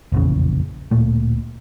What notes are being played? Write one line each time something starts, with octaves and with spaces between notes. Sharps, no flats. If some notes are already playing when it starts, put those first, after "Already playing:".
F1 A#1 E2 C#3
D1 A#2 A3